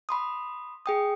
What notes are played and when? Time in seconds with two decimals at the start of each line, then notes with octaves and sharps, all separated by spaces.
0.09 B5 C6 D#6
0.86 G#4 G5 D#6